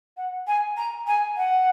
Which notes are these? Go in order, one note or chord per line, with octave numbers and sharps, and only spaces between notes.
F#5
G#5
A#5
G#5
F#5